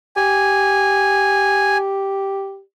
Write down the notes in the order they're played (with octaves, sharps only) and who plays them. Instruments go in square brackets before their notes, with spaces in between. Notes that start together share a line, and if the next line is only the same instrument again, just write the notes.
[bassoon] G4 [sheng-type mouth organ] G#5